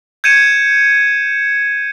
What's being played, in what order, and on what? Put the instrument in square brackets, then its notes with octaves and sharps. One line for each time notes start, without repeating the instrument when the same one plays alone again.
[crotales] G6 G#6 C#7 D#7 E7